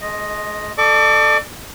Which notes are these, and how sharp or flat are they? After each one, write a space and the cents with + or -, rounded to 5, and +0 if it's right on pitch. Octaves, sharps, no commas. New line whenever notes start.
G#3 +30 D#5 +0
A4 +0 D5 +35 D6 -35